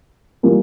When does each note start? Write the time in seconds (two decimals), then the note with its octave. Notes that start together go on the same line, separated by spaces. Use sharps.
0.43 E3 G3 A#3 F4 A#4